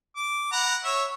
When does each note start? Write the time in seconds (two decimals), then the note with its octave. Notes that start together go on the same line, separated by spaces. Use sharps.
0.16 D6
0.52 F#5 A#5 B5
0.84 C#5 E5